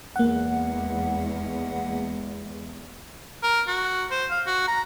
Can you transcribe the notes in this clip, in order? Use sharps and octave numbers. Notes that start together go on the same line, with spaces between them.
E2 G#3 A#3 F#5
A#4
F#4
C5
F5
F#4
A#5